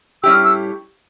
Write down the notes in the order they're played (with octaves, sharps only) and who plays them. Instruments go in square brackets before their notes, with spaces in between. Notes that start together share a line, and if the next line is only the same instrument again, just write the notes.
[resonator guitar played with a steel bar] A2 G3 C#4 E4 G4 [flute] E6
[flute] E6